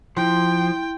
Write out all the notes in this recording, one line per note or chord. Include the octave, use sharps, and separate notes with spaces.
F3 E4 G5 C6